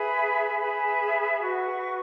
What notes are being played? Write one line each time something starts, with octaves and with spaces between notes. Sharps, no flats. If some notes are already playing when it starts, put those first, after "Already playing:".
Already playing: G#4 B4 E5 B5
G#4 B4 E5 B5
F#4 B4 F#5 C#6